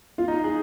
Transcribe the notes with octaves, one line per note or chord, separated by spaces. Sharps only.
F4
D#4
G#4